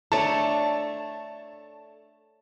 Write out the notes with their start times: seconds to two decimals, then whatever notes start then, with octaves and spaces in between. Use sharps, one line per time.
0.12 A3 D4 C#5 A5